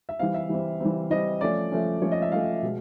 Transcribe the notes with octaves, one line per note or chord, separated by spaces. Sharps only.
E5
E3 G3 C4 F5
E5
E3 G3 C4
E3 G3 C4
E3 G3 C4 D#5
F3 A3 C#4 D5
F3 A3 C#4
F3 A3 C#4 C#5
D#5
E5
F3 A3 C#4 F5
B2 G#3